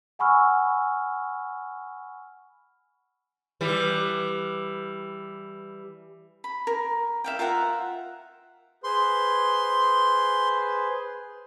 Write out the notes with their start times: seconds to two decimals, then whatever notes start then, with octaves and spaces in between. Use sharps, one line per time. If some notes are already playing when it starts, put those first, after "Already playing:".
0.19 F#5 G#5 B5 C#6 E6 F6
3.61 E3 G3
6.44 B5
6.67 A#4
7.24 E5 F5 G5
7.39 F4 A#4 E5 F#5
8.84 G#4 B4 C5 C6